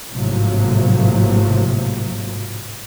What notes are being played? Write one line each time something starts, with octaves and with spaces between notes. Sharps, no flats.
G#1 A2 C3 F3 F#3 A#3